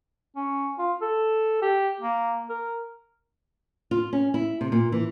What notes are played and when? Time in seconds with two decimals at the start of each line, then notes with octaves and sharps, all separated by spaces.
0.36 C#4
0.78 F4
1.01 A4
1.62 G4
2.00 A#3
2.49 A#4
3.91 F4
4.13 C#4
4.34 E4
4.61 C3
4.72 A#2
4.92 E3